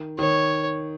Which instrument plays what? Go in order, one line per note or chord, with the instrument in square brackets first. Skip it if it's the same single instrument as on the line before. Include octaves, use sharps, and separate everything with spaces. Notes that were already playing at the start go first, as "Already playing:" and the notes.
Already playing: [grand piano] D#3
[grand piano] D#3 [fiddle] C#5